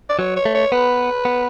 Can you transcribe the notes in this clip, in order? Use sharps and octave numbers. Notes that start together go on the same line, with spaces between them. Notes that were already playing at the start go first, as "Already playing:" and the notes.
D5
F#3 C#5
C#5
A3
C#5
B3 B4
B3